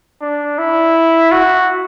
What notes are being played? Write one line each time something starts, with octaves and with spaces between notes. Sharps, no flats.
D4
E4
F#4